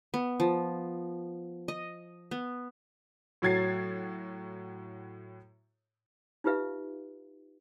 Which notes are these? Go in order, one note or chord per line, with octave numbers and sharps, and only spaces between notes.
B3
F3
D#5
B3
A2 F#3 F#4 G#6 A6 C7
D#4 F4 G4 B4 E5 F5